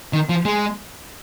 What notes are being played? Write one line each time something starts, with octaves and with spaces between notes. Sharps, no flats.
D#3
F3
G#3